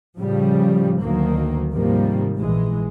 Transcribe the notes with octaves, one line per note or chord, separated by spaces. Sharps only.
A2 C#3 F3 G3
D2 D#3 F#3 A#3
G#2 C3 D#3 F3 G3 A#3
A#1 E3 G#3